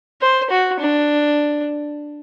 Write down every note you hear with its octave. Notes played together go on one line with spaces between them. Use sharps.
C5
F#4
D4